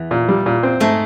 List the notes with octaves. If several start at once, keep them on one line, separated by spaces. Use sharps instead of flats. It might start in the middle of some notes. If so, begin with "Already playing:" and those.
Already playing: E2 E3
A#2
G3
A#2
C4
G#2 G#3 A3